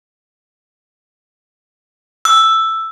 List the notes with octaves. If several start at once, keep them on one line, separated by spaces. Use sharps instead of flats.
E6